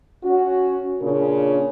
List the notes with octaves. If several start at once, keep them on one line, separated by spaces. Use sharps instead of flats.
C#4 F#4
A#2 C#3 C#4 D4 A#4